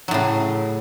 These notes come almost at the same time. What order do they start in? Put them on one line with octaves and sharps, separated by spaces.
F#3 A2 C#3